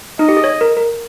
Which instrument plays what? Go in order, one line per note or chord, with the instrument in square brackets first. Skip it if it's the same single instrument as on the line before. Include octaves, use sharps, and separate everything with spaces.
[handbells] D#4 [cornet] D#5
[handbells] G4
G#4
C#5
A#4
A#4